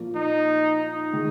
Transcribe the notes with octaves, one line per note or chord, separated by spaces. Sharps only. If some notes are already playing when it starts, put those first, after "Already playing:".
Already playing: A#2 F3 A#3 F4
D#4
D#4
D#3 G#3